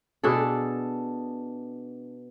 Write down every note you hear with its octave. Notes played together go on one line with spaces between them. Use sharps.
B2 D4 G#4 A4